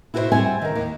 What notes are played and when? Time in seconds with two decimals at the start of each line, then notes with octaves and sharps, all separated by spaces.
0.14 E4 F#4 A4 A#4 C5 E5
0.32 G3 C4 E5 F#5 G#5
0.62 D#3 A#4
0.75 D#2